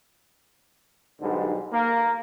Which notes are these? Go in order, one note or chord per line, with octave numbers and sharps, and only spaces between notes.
B1 G#2 D3 G3
A#3